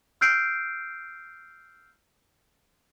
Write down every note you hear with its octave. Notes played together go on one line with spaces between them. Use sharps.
E6 F6 G6 C7 D7